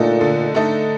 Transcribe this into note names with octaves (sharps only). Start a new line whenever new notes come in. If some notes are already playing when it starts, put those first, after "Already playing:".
Already playing: A#2 D3 A3 D#4 A4 D#5
D3
A3 D#4 A4 D#5